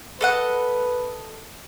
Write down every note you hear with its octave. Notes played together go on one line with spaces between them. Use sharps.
A4 B4 D#5 F#5